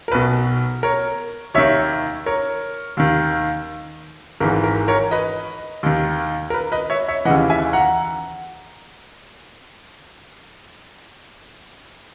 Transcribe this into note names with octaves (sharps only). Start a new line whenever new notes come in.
A#4
B1 B2 B4
A#4 C#5
D#2 D#3 C#5 E5
A#4 C#5
D#2 D#3
G#1 G#2 E3 A#4
A#4
A#4 C#5
B4 D#5
D#2 D#3
A#4
B4
B4 D#5
C#5 E5
C#5 E5
D#2 C#3 E3 D#5 F#5
E5 G#5
F#5 A#5